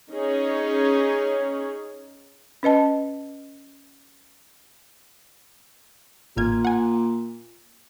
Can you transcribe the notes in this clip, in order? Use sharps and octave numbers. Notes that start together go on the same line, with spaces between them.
C#4 D#4 G#4 C#5
C#4 B4 D#5 A5
A1 A#2 F6 G#6
F#5 G#5